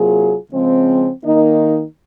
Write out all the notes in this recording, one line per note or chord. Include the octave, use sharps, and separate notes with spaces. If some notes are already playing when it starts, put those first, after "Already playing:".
Already playing: C3 F#3 A#3 F4 G#4
C#3 F3 G#3 C4
D#3 A#3 D#4